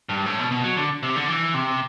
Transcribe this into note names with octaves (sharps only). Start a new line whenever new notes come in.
G2
A2
B2
B2
F#3
D3
C3
D3
E3
C3